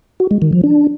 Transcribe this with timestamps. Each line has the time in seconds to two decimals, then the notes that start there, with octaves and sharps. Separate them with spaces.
0.20 F#4
0.31 G#3
0.42 D#3
0.53 F3
0.63 D4